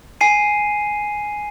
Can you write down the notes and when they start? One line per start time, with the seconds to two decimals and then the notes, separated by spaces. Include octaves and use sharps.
0.21 G#5 C7 D#7